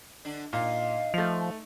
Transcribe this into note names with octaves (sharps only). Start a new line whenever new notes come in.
D3 D4
A#2 D#4 F5
F3 A3 F7